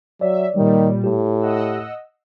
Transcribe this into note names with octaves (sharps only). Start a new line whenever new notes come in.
F#3 C#5 D5 E5
A#2 D#3 G3
A2 G4
D#5 F#5 E6